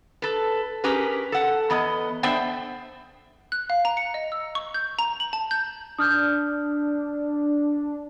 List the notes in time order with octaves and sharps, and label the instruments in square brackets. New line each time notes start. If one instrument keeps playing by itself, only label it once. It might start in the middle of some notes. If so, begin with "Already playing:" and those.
[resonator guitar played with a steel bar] A4 B4
C#4 G4 G#4 A#4 B4
A4 F#5
E2 B3 D#5
B3 D4 A4 C5 E5 G5
[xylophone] F#6
F5
A#5
C#7
D#5
E6
C#6
G6
A#5
F#7
A5
G6
[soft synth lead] D4 [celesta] D#6 F6 G6